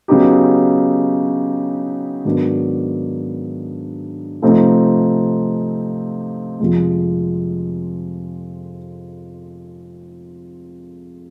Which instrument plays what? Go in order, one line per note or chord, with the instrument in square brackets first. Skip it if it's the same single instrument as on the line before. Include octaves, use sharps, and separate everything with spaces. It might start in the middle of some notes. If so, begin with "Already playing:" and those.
[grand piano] C#3 F#3 B3 D#4 G4
G#2 D#3 F#3 B3 D4
C3 F3 A3 C4 D#4
F2 C3 F3 G#3